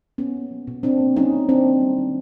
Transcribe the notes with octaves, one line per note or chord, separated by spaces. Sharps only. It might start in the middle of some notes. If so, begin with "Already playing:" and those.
B2 B3 C#4
A#3
F#3
B2
B2 C4 D4
A#3
F#3 C#4 D#4
B2
D#3 C4 D4
A#3
G3
D#3